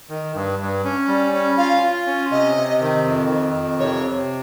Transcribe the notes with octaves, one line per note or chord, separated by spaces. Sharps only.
D#3
G2
G2
C#4
G3
C#4
F4 F5
F4
C#4
C3 D#5
C3
D#3
F2
D#3
F2
C3 C#5
C3